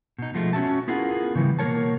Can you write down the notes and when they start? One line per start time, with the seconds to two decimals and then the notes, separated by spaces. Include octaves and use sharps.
0.19 B2 D#4
0.34 B2 F3 G#3 A3
0.53 C#4 F#4 E5 A5
0.88 B3 E4 F4 G#4 A#4 F#5
1.35 C#3 E3 G3
1.59 B2 A#3 F4 A#4 C#5 A5